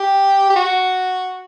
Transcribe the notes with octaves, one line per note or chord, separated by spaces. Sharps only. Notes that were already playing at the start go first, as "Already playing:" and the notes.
Already playing: G4
G4
F#4